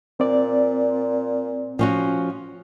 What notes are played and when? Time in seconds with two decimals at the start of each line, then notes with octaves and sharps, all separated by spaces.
0.20 A#2 C4 D5
1.79 F3 C#4 F#4